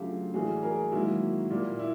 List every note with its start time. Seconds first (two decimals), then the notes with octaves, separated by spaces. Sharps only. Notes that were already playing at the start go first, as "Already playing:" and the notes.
Already playing: D2 C#3 F#3 A3 F4 G4
0.34 A2 E3 G3 F#4 G#4
0.63 G#4 A#4
0.92 G#2 D#3 F#3 A#3 E4 F#4
1.50 A#2 G3 A#3
1.79 E4